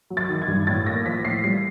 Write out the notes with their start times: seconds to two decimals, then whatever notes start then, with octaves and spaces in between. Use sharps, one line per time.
0.10 F#3
0.17 A6
0.29 D#3
0.42 G#6
0.48 G2
0.67 A2 A6
0.87 A#3 A#6
1.06 F3 B6
1.25 A2 C7
1.44 G3 C7